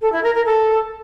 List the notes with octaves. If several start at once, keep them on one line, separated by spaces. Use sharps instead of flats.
A4
E4
A#4
A#4
A4